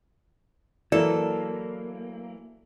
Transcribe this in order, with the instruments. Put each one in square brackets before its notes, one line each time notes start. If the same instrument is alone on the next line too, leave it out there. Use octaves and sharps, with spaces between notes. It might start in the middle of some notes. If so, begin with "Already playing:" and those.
[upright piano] E3 [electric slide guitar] F#3 A#3 [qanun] A4 [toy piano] D5